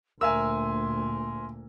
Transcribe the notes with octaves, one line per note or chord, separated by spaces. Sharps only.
D2 A#2 A#4 E5 G#5 C6 E6